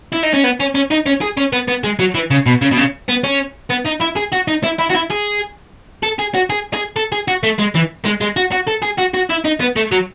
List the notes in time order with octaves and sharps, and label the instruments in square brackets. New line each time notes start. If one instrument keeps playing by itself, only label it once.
[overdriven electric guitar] E4
D#4
C#4
B3
C#4
C#4
D#4
C#4
G#4
C#4
B3
B3
G#3
F#3
E3
C#3
B2
C#3
B2
C#3
B3
C#4
B3
D#4
E4
G#4
F#4
D#4
E4
E4
F#4
E4
G#4
A4
G#4
F#4
G#4
G#4
A4
G#4
F#4
A3
G#3
E3
G#3
G#3
F#4
F#4
A4
G#4
F#4
F#4
E4
D#4
B3
A3
F#3